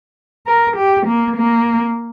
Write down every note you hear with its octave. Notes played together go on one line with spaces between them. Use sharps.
A#4
G4
A#3
A#3